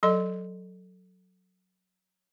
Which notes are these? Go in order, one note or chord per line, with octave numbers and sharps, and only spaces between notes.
F#3 A4 D#5 C6